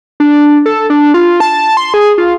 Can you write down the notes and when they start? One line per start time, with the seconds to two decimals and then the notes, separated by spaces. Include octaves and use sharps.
0.20 D4
0.66 A4
0.90 D4
1.14 F4
1.40 A5
1.77 C6
1.94 G#4
2.18 F4